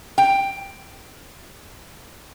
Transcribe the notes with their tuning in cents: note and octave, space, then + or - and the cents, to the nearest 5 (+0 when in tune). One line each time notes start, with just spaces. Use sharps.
G5 +10